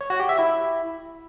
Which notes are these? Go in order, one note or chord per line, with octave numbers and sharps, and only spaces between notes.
C#5
F#4
G4
E5
E4